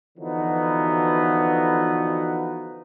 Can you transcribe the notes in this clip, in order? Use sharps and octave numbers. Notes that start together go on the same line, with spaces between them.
D3 E3 F3 B3 D#4 F#4